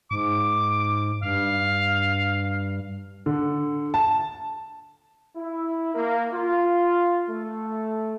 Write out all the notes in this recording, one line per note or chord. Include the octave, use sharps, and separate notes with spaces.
G#2 D6
G2 F5
D3
A5
E4
A#3
F4
A3